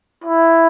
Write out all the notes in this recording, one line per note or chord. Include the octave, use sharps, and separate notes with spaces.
E4